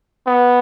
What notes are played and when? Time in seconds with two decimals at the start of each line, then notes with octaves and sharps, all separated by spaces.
0.26 B3